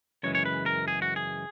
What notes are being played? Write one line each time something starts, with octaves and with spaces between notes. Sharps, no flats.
F#2 C#3 E3 G#3 C#5
C#5
B4
A#4
G#4
F#4
G#4